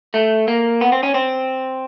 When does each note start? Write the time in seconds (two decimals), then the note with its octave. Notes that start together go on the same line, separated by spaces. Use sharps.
0.14 A3
0.48 A#3
0.81 B3
0.92 C4
1.03 C#4
1.14 C4